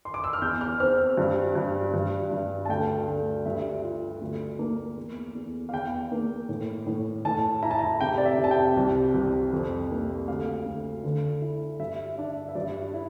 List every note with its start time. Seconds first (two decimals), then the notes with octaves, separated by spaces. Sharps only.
0.05 C6
0.14 D6
0.24 E6
0.33 F6
0.42 E2 G6
0.61 F6
0.80 C4 F6
1.18 G2
1.55 G2
1.94 G2
2.31 G2
2.65 A5
2.69 D2 G5
3.08 D2
3.46 G2 E5
3.84 F4
4.22 D2
4.59 A#3
4.97 E2
5.35 E2
5.69 F5
5.73 E2 G5
6.11 A#3
6.49 A2
6.87 A2
7.25 A2 A5
7.63 E4 A#5
7.71 A5
7.79 A#5
8.00 C3 G5
8.18 D5
8.25 E5
8.38 C3
8.44 A5
8.51 G5
8.77 C2
9.14 C2
9.53 F2
9.91 A#3
10.28 D2 F5
10.66 D2
11.03 D3
11.42 E4
11.80 G2 E5
12.18 D4 E5
12.49 E5
12.55 G2 D5
12.94 E4